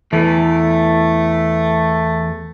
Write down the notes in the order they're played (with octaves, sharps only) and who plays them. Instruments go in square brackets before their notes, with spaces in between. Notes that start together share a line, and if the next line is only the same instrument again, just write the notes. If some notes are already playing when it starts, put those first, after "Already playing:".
[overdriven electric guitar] E2 [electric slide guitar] E3 [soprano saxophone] A3